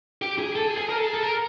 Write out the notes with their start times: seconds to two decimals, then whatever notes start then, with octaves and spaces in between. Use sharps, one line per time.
0.22 G4
0.39 G#4
0.56 A4
0.67 G#4
0.77 G#4
0.89 A#4
0.97 A4
1.07 G#4
1.14 A4
1.23 A#4